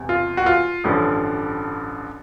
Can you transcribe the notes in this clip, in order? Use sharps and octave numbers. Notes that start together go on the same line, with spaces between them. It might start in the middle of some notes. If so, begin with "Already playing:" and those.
Already playing: E1 E2 C3
F4
F#4
F4
A1 G2 D3 F3